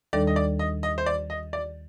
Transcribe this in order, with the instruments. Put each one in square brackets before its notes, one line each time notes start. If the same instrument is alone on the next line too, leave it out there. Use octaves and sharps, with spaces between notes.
[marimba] D#2 D#3 G3 D4 A4 [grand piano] D5
[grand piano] D#5
D5
D#5
D#5
C5
D5
D#5
D5